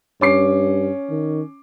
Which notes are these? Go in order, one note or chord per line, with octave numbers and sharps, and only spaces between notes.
G2 C#4 D6 C7
D#3